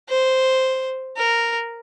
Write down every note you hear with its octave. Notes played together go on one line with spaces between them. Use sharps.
C5
A#4